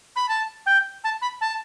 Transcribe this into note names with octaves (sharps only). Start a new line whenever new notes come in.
B5
A5
G5
A5
B5
A5